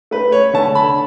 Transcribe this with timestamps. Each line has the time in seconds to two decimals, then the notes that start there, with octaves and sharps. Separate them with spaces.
0.11 A3 B4
0.32 C#5
0.53 D3 A5
0.75 B5